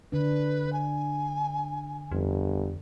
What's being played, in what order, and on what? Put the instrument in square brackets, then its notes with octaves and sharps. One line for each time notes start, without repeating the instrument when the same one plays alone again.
[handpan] D3 D4 [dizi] B4
[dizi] G#5
[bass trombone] G1 [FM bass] F2